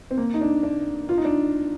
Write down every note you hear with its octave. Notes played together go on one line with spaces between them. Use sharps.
C4
A#3
D#4
D4
D4
F4
D#4
D4